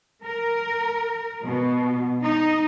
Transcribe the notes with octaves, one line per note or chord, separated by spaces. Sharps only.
A#4
B2
D#4